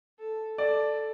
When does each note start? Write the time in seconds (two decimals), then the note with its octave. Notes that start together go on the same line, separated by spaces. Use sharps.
0.19 A4
0.58 A4 D5